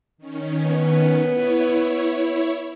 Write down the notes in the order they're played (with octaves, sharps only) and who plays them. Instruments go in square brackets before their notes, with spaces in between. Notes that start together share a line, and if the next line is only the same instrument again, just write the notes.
[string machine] D#3 C#4
[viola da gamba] B3
[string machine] E4 C#5